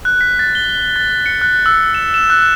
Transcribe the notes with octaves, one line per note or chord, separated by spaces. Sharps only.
F#6
B6
A6
G7
A6
C#7
F#6
E6
E7
E7
F#6